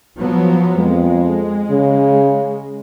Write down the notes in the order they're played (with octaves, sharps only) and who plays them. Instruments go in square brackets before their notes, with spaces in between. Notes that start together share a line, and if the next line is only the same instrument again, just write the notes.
[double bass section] F3 F#3 B3
[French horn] F2 [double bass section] G#3
[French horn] C#3